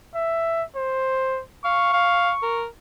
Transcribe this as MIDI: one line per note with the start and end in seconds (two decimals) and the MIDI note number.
0.15 0.64 76
0.76 1.41 72
1.64 1.91 77
1.64 2.64 85
1.93 2.31 77
2.42 2.66 70